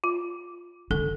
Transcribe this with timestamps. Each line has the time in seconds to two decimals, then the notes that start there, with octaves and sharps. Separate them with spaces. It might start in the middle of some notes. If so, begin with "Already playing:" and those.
0.04 F4
0.91 D3 A4